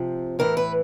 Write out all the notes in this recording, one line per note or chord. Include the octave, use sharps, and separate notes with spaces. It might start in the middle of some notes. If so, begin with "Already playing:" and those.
Already playing: C3 F3
A2 E3 A#4
B4